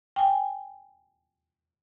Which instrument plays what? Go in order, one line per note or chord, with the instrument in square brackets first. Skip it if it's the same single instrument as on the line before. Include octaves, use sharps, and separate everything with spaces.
[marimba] G5 G#5